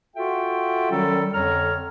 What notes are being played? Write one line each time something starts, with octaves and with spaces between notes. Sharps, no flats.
F4 F#4 A4 E5 G5
D#3 F#3 G3 C#4 A4
F2 D3 C#5 A#5 F6